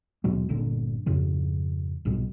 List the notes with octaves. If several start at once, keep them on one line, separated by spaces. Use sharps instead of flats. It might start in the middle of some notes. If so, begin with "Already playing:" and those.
D#2 B2 F#3 G#3
G1 G2 A#2 D3
F2 G#2 C#3 F3
B1 G#2 B2 G3